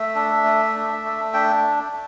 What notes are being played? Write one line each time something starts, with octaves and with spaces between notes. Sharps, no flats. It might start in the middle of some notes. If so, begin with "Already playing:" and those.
Already playing: A3 E5
D4
A3
D4
A3
D4 G5